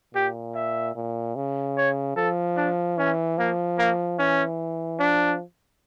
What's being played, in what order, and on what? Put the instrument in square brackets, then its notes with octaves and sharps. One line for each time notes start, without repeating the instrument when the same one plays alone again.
[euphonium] A#2 [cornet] G4
[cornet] E5
[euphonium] A#2
C#3
[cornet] C#5
[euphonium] F3 [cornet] A4
[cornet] D4
[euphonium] E3 [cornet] C#4
[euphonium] F3 [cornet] A#3
[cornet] A#3
[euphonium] E3 [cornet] C#4
[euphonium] F3 [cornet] D4